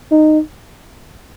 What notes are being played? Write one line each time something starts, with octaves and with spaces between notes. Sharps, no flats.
D#4